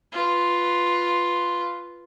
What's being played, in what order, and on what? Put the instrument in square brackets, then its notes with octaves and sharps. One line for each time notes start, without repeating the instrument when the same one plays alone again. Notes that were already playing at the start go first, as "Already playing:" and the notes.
[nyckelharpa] F4 B4